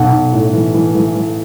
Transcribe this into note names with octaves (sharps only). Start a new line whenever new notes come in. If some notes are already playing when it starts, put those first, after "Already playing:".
Already playing: B1 F#5
B1
A2
E3
E3
E3
E3